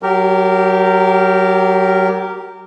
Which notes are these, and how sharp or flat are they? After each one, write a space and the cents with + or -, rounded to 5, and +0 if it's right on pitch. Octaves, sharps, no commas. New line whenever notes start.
F#3 +25 G4 -10 A#4 -15